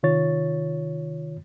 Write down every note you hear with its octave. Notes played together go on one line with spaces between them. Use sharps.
C3 D#3 F4 C#5 A6